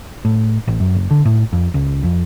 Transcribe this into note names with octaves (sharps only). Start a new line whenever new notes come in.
A2
A1
F#2
F#1
D3
A2
F2
C#2
F2